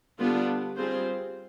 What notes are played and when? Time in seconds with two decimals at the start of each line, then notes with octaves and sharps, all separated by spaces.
0.19 D3 G3 B3 D4 F4
0.76 G3 C4 F4 G#4 C5